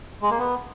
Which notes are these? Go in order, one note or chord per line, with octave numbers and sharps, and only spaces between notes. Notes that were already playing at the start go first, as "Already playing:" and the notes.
G#3
A#3
B3